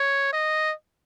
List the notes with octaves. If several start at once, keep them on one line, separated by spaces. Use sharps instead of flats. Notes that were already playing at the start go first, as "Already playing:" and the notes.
Already playing: C#5
D#5